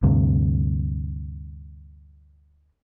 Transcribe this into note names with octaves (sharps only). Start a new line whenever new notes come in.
D2 G2 C3